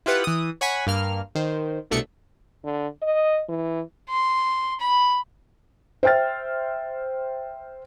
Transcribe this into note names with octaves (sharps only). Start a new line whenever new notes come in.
E4 F4 G4 B4 F#5
E3 D#6
C#5 F#5 G#5 B5 C#6
G2 A#3 F6
D#3 C5
C2 B2 A3 D4 E5 C#7
D3
D#5
E3
C6
B5
C5 E5 G5 F6 A6